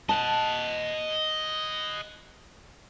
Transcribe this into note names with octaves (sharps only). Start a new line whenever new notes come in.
D#5 F#5 A5